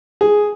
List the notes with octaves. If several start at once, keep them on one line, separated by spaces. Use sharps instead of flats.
G#4